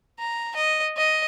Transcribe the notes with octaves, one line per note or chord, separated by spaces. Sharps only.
A#5
D#5
D#5